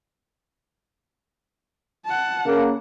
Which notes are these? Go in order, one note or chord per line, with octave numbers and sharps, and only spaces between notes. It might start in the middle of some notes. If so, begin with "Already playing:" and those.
F#5 A5
C#3 A#3